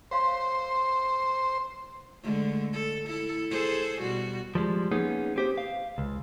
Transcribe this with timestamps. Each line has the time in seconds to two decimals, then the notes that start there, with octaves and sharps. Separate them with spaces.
0.11 C5 C#5 F5 C6
2.23 D3 G#3 A3
2.73 A4
3.06 E4 A4
3.51 G#4 A4 C5
4.01 B2 G3 F#4
4.55 F3 G3 G#3
4.92 A#3 B3 C#4 D#4 G#4
5.36 C4 G4 C5
5.58 F5
5.98 C#2